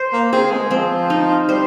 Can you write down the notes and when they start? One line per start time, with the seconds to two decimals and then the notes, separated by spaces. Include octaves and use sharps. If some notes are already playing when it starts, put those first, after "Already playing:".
Already playing: C5
0.13 A#3
0.33 C4 G#4
0.52 G#3
0.71 F3 C4
1.10 D#4
1.49 G3 C5